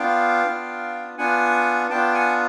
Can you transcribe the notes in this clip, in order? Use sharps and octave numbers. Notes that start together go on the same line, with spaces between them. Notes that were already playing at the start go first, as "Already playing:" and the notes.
Already playing: B3 D4 F4 F5 G5
B3 D4 F4
B3 D4 F4 F#5 G#5
B3 D4 F4 G5 A5
F#5 G#5